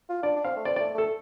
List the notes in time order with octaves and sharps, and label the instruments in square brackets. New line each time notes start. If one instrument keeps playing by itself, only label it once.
[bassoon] F4
[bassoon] D4 [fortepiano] D5
[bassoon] D4
[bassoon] C4 [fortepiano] F5
[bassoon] A3
[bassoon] C4 [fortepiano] D5
[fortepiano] D5
[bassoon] A3
[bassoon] A3 [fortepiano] A4